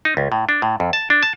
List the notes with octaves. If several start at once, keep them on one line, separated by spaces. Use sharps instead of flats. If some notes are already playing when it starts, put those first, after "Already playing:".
D#4
C#2
A2
D4
A2
F2
A5
D4
A5